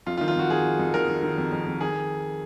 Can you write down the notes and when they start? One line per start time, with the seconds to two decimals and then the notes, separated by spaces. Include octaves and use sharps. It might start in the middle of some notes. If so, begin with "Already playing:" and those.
0.06 F2 F4
0.17 F4
0.21 D#3
0.28 F4
0.36 F2 F#4
0.50 D#3 G#4
0.64 F2
0.79 F2
0.94 D#3 A#4
1.08 D#3
1.23 D#3
1.38 F2
1.52 F2
1.66 F2
1.81 D#3 G#4